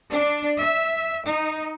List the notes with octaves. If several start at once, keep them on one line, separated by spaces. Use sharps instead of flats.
D4
E5
D#4